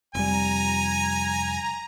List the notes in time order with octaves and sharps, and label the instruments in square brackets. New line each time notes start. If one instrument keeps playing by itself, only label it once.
[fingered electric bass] F1 G3 [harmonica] G#5 [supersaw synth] A#5